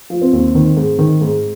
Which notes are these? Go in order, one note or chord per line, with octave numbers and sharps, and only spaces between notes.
F3
C4
D#2
D#3
G#2
D#3
G#2